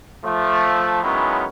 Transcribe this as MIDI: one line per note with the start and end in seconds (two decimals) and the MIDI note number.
0.24 1.01 53
0.24 1.01 57
1.03 1.44 51
1.03 1.44 54
1.03 1.44 56
1.03 1.44 59
1.03 1.44 61
1.03 1.44 64